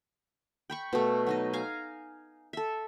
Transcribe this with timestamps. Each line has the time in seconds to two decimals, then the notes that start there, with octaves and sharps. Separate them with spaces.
0.70 G5 B5 C#6
0.93 B2 A3
1.27 F#3 D#4 D#5
1.53 F5 G#5 A#5
2.53 A4 E5